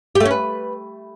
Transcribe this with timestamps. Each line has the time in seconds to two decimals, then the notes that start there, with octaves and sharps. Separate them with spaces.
0.15 G4
0.20 A3
0.25 C#4
0.31 B4